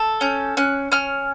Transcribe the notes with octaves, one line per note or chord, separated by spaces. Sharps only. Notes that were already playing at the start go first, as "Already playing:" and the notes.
Already playing: A4
C#4 G6
C#4 F#6
C#4 F6